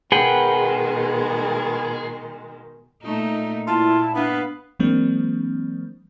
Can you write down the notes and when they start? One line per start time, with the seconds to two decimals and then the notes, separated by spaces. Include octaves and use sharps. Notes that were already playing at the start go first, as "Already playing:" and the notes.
0.12 B2 D#3 G#3 G#4 B4 F#5 G5
3.02 A#2 A3 D#4
3.67 A#2 E4 F4 A5
4.15 B3 D4 B4 F5
4.79 E3 F#3 G#3 A#3 C4 D4